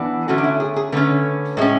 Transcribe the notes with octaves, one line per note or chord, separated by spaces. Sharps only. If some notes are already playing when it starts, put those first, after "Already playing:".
Already playing: E3 B3 D4
D3 A3 C#4 F#4
D4
E4
G#4
G#4
D3 A3 C#4 B4
A2 G#3 C#4